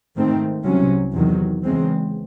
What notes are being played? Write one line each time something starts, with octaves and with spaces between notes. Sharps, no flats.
G#2 D#3 A3 C4
C2 C3 F#3 C#4
E2 C3 D#3 F#3
E2 C#3 G#3 C4